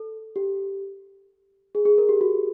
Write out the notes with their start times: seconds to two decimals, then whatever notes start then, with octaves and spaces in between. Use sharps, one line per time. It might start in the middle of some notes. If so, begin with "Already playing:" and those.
Already playing: A4
0.36 G4
1.75 G#4
1.85 G#4
1.98 A#4
2.09 G4
2.21 F#4